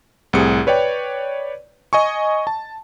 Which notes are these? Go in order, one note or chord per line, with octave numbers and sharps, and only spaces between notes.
C2 A2 C3 G#4 C#7
B4 C#5 D5 G5
D#5 G#5 C#6
A5